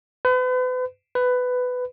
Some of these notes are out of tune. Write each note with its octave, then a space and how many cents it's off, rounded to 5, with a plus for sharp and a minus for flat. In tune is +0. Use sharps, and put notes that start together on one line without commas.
B4 +40
B4 +15